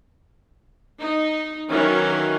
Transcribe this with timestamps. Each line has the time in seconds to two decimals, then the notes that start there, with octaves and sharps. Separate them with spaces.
1.00 D#4
1.69 D#3 E3 F#3 C#4 A#4